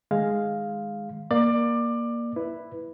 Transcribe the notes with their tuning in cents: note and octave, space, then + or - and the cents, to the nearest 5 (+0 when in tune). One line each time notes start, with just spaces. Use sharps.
D#3 +0 G#3 +0 F5 +0
A#3 +10 D5 +20 D6 +20
E4 +0 B4 +0